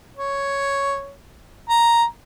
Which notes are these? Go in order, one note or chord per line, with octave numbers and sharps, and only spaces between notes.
C#5
A#5